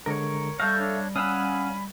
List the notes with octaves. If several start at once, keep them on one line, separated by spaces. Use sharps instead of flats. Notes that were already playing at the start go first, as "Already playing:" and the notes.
D3 G#3 A#4 C#5
G3 A4 E5 F5 A5 C#6 G6 A#6
D4 C#5
C#4 F5 F#5 G#5 B5 D#6 E6